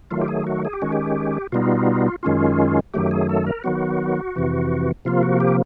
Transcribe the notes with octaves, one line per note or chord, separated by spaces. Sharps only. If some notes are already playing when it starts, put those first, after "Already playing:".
D#3 F#3 A3 F4
G4
G#4
F#4
G#4
G4
D#3 G#3 C#4 F#4
G4
B2 G3 B3 D#4 F4
F#2 D#3 G#3 C#4 F4
F#2 D#3 F#3 A3 G4
G#4
A4
A#4
D#3 F#3 B3 F#4
F2 C3 E3
C3 F3 A#3 F4
F#4
G4